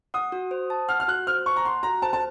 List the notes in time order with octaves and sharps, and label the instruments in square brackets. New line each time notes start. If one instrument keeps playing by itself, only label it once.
[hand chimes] F#5 [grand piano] D#6
[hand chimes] F#4
C5
A5
[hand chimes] F#5 [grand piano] F6
[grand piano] F6
[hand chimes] F#4 [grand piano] F#6
[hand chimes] C5 [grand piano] F6
[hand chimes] A5 [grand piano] C#6
[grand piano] A#5
[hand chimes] F#5 [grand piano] C6
[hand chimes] F#4 [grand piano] A#5
[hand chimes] C5 [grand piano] A5
[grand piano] A5